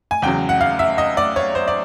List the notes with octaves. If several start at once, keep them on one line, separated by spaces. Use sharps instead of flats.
G#5
E2 C#3 F#3 G5
F#5
F5
E5
D#5
D5
C#5
C5
D5